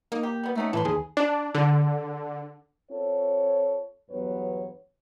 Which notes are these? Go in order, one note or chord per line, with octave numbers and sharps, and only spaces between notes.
A#3 D#4
G4
G3 B3
A3 C#4 D#4 F#4
A2 E3 A4 B4 C6
D#2 G#4
D4
D3
C4 F4 A4 C#5
E2 G2 F#3 B3 B4 C#5